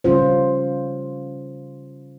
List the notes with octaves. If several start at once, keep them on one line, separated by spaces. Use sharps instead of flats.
C#3 G3 C#4 F4 C5